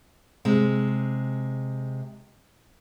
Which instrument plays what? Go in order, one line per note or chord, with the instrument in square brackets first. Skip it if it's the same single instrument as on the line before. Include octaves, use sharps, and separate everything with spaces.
[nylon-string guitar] C3 G#3